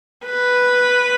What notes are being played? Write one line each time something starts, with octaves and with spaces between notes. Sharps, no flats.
B4